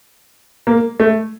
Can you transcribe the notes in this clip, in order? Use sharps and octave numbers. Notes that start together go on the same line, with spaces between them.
A#3
A3